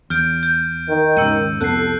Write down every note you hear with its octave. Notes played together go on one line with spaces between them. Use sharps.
E2 F6 G6 D7
G6
D#3
D#2 G#2 C#3 E6 C#7 D#7
C2 F2 B3 A4 F#6 C7